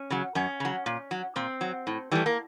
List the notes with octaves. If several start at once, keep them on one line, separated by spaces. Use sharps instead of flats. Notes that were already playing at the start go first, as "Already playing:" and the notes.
Already playing: C#4
C#3 F#3
F#2 C#4
C#3 F#3
A#2
F#3
A#2 C4
F#3
A2
E3 G3 A3
A#3